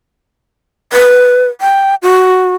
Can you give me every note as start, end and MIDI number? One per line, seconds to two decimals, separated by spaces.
0.93 1.47 71
1.61 1.95 79
2.02 2.56 66